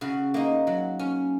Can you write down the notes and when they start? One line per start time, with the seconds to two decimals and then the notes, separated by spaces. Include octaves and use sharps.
0.01 C#3 F#4
0.34 A#3 D#4
0.67 F#3
0.99 C#4